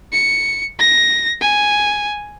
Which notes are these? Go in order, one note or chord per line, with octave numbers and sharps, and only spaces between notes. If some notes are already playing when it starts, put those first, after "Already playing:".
C#7
A#6
G#5